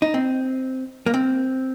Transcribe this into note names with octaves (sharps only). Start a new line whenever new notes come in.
D#4
C4
A#3
C4